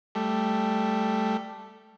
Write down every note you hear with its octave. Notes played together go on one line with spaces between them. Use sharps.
G3 A3